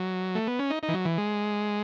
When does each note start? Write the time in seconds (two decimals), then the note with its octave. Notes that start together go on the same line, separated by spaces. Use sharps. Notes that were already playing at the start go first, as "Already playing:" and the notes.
Already playing: F#3
0.35 A3
0.47 B3
0.59 C#4
0.70 D#4
0.83 D#4
0.88 E3
0.94 F#3
1.05 E3
1.18 G#3